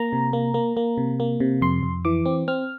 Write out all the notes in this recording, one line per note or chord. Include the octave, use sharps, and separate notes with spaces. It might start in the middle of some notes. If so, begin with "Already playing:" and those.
Already playing: A#3 A#5
C3
A#3
A#3
A#3
C3
A#3
C3
F2 C6
F2
E3 D6
C4
C4 F6